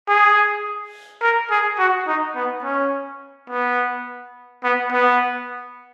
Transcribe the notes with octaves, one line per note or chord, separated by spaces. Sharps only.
G#4
A#4
G#4
F#4
D#4
B3
C#4
B3
B3
B3